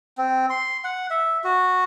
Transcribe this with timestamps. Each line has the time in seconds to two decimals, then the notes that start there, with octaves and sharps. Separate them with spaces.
0.18 C4
0.50 C6
0.84 F#5
1.10 E5
1.44 F#4